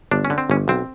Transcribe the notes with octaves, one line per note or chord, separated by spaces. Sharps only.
G1 D4
C#4
D3
C4
G1 C#4
B1 C4